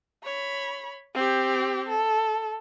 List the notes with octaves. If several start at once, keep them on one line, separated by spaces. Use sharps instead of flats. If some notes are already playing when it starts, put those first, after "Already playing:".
C#5 B5
C4 G4
A4